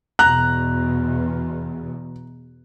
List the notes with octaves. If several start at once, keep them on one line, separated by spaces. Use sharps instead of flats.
E2 B2 A#5 F#6